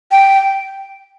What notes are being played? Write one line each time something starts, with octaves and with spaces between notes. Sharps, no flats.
G5